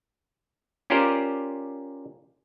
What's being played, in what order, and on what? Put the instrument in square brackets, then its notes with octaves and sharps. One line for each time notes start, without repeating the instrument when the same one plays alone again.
[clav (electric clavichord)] C#4 F4 G4 A#4 C5 D5